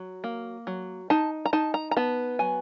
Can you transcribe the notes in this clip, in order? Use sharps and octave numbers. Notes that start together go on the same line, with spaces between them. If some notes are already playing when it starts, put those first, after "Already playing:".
Already playing: F#3
A#3
F#3
D#4 A5
A#5
D#4 A5
A#5
A#5
B3 A5
F#3 G#5